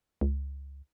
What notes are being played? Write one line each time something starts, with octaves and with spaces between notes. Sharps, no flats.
C#2